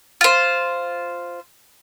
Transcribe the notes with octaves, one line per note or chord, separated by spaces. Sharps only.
F4 C5